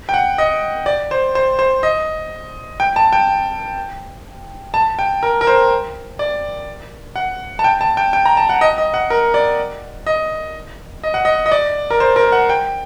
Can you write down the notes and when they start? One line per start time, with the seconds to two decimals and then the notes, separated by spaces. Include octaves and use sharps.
0.09 G5
0.14 F#5
0.38 D#5
0.86 D5
1.11 C5
1.35 C5
1.59 C5
1.83 D#5
2.80 G5
2.96 A5
3.13 G5
4.74 A5
4.99 G5
5.23 A#4
5.41 A#4
5.47 C5
6.19 D5
7.16 F#5
7.59 A5
7.64 G5
7.81 A5
7.97 G5
8.13 G5
8.25 A#5
8.37 A5
8.49 F#5
8.61 D#5
8.78 D#5
8.94 F#5
9.10 A#4
9.34 D5
10.07 D#5
11.04 D#5
11.14 F#5
11.25 D#5
11.46 D#5
11.52 D5
11.90 A#4
12.00 C5
12.16 A#4
12.32 F#5
12.49 G5